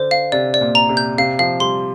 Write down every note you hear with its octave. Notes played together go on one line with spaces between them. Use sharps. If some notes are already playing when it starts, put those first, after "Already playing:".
Already playing: D3 C5
F5
C3 D5
D5
A#2
A#5
C3
G6
C3 F5
F3 F5
G3 C6